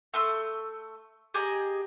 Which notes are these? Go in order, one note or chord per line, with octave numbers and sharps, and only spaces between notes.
A3 C6 E6
G4 G#4 D#5 A#5